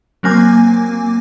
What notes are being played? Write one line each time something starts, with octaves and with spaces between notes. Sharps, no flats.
F#3 A#3 C4 G#5 D6